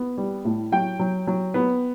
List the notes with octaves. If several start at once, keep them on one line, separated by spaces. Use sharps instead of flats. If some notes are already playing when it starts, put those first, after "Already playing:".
Already playing: B3
G3
A2
F#3 G5
F#3
F#3
B3